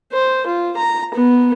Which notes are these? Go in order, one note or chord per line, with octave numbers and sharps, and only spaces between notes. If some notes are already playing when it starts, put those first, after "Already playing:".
C5
F4
A#5
B3